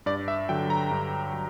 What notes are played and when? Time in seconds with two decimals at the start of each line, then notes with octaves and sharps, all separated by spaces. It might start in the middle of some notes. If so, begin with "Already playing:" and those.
0.06 G2 D5
0.28 E5
0.49 D3 F#3 G5
0.70 A#5
0.91 G2
1.33 F#3